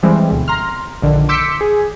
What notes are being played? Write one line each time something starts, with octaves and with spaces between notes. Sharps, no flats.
E3 G3 G#3 C4
D2 B2
A#5 C6 F6
A#1 D3 D#3
C6 D6 E6 G6 B6 C#7
G#4